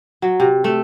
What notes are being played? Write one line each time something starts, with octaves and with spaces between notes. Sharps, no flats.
F#3
C3
A3